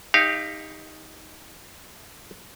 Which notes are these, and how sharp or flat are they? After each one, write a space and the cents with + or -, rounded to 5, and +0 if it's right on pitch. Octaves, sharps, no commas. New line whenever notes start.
D#4 +10 G4 +25 F5 -20